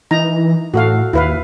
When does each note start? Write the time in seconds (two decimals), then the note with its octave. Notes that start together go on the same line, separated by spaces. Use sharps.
0.11 E3 D#4 A#5
0.74 A2 F#4 A4 F5
1.13 D#2 E4 B4 F5